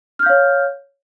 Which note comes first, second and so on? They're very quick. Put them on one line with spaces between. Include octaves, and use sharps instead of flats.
F6 G6 F5 C#5